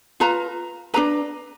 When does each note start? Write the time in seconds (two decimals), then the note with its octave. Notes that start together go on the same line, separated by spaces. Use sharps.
0.20 F4 B4 A#5
0.94 D4 G#4 B4 A#5